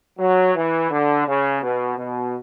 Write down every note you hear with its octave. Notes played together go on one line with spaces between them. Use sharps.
F#3
E3
D3
C#3
B2
B2